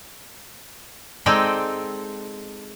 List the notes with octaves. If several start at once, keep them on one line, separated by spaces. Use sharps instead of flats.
G#3 C4 D#4 A4 D5 G5